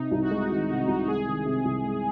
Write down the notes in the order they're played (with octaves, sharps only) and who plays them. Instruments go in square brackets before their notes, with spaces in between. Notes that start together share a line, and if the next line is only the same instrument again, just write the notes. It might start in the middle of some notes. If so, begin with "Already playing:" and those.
Already playing: [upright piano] C3 [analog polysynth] D#4
[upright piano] C2
[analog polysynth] F#4
[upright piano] G#3
D#3
C3
C2
[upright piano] G#3 [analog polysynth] G#4
[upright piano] D#3
C3
C2
G#3